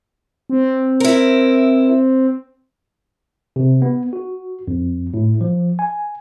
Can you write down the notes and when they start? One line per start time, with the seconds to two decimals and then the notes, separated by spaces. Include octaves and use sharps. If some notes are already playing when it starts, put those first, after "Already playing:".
0.50 C4
1.00 E4 A#4
3.56 C3
3.82 B3
4.13 F#4
4.68 F2
5.14 A2
5.41 F3
5.79 G#5